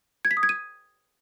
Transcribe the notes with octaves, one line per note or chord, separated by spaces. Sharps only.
G#6
B6
D#6
G#6
D#7